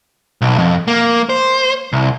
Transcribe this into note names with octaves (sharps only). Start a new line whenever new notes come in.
B1
F2
A#3
C5
C2